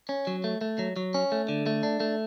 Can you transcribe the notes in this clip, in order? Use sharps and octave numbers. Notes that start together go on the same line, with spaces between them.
C#4
F#3
A3
A3
F#3
F#3
C#4
A3
D3
A3
D4
A3